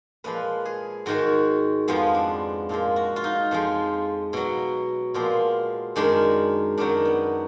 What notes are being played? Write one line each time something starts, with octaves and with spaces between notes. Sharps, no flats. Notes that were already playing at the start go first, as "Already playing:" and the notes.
A#2 F3 G#3 B4
G#4
G#2 D#3 G#3 F#4
F2 F3 G#3 B3
D4
A#2 F3 G#3 F4
F#4
F4
D#4
F2 F3 G#3
B2 F#3
A#2 F3 G#3 B3
F#2 D#3 G#3 D4
F#2 D#3 F#3 D4
B3